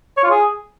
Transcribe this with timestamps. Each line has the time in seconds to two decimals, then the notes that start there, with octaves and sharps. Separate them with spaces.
0.17 C#5
0.24 F4
0.30 G#4